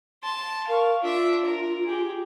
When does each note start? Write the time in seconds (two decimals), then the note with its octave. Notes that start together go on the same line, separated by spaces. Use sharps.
0.23 A5 C6
0.68 A#4 F5 C#6
1.02 D4 F4 E5
1.45 A#4
1.85 G4 G#4